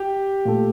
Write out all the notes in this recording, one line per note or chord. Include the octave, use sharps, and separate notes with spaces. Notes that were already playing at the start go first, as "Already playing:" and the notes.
Already playing: G4
A#2 A3